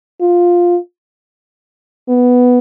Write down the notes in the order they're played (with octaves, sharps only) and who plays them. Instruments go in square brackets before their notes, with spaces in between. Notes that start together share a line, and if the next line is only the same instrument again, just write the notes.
[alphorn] F4
B3